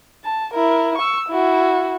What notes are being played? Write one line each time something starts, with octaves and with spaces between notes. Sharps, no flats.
A5
E4 A#4
C#6 E6
E4 F#4